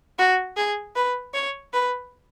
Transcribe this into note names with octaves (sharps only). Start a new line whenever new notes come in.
F#4
G#4
B4
C#5
B4